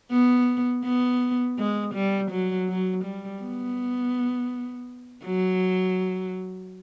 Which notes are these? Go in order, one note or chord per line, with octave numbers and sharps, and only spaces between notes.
B3
B3
G#3
G3
F#3
F#3
G3
B3
F#3